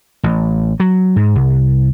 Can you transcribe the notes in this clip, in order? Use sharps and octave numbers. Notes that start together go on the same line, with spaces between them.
A1
F#3
G#2
C2